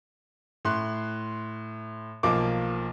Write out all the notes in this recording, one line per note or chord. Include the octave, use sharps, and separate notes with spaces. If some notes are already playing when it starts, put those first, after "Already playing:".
A2 C6 F#6
B1 F3 A#3 D6